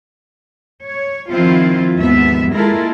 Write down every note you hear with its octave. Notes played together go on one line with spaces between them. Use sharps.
C#5
D#3 F3 C4 E4 F4
D#2 G#2 F3 B3 E5
G#3 A#3 E4 F4 A4 A#4